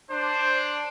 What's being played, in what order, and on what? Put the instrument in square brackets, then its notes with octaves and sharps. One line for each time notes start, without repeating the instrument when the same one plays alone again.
[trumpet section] D4 [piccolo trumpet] C5